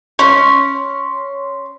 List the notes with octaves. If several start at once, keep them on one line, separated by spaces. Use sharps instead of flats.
C#4 C6